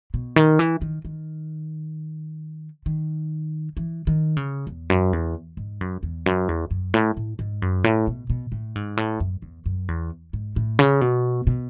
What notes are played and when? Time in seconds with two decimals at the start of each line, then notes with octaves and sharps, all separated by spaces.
0.14 B2
0.36 D#3
0.59 E3
0.82 D#3
1.05 D#3
2.86 D#3
3.77 E3
4.07 D#3
4.37 C#3
4.67 E2
4.90 F#2
5.13 E2
5.57 G#2
5.81 F#2
6.03 E2
6.26 F#2
6.49 E2
6.71 F#2
6.94 A2
7.17 A2
7.39 G#2
7.62 F#2
7.84 A2
8.07 B2
8.30 B2
8.52 A2
8.76 G#2
8.97 A2
9.20 F#2
9.42 E2
9.66 F#2
9.88 E2
10.33 G#2
10.56 A2
10.79 C#3
11.01 B2
11.47 B2